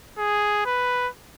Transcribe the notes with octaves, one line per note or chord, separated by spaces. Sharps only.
G#4
B4